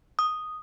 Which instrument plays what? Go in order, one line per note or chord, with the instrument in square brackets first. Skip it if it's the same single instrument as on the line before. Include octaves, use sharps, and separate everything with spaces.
[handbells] D#6